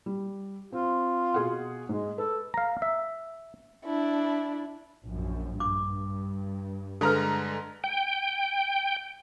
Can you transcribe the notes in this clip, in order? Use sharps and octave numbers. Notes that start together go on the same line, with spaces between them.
G3
C4 F4
B2 G#4 F#5
G#2 G#3
A4 B4
F5 A#5
E5
D4 E4
A#1 F#2
G2 D6
D3 G#3 A4 B4 A#5
G5